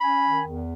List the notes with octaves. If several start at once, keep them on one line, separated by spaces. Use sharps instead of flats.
C#4 G#5 B5
D#3
E2